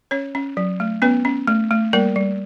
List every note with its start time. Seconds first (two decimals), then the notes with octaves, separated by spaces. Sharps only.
0.11 C#4 C#5
0.35 C#4
0.57 F#3
0.80 A3
1.02 B3 C#4 B4
1.25 C#4
1.47 A3
1.71 A3
1.93 G3 A#3 A#4
2.16 G3